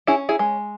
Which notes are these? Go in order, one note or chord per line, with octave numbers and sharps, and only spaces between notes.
C#4 E4 G#4
E4 G#4
G#3